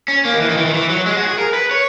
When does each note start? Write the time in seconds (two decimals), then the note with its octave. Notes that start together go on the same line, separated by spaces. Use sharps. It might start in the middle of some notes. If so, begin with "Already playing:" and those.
0.08 C#4
0.25 A#3
0.33 D#3
0.41 E3
0.50 D#3
0.58 E3
0.66 D#3
0.74 E3
0.90 F#3
1.06 G#3
1.11 G#4
1.17 F#4
1.27 G#4
1.38 A#4
1.54 B4
1.71 C#5